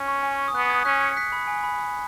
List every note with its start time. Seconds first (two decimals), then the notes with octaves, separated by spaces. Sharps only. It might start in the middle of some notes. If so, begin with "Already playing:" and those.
Already playing: C#4
0.08 C#6
0.23 G#5
0.39 C#6
0.48 D#6
0.55 B3 F#6
0.70 D#6 G#6
0.85 C#4 F#6 B6
1.01 G#6 C#7
1.16 F#6 B6
1.32 B5
1.47 G#5
1.63 B5